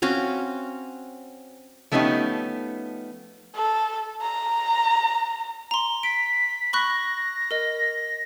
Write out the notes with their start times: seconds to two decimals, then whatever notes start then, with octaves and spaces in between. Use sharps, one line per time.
0.02 C4 C#4 F#4 F5
1.92 F3 A3 B3 C#4 D#4 G4
3.55 A4
4.22 A#5
5.71 A#5 C6
6.03 B6 D7
6.73 B5 C#6 F#6 A#6
7.51 A#4 D#5